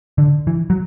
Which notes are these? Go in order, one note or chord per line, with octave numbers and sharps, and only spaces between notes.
D3
E3
F#3